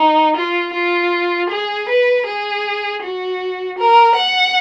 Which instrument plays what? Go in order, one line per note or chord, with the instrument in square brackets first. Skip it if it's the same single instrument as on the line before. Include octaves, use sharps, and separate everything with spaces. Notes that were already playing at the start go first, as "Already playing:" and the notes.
Already playing: [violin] D#4
F4
F4
G#4
B4
G#4
F#4
A#4
F#5